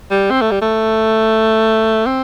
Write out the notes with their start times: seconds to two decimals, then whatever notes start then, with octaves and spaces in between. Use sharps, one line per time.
0.10 G3
0.31 C4
0.41 A3
0.51 G3
0.61 A3
2.06 C4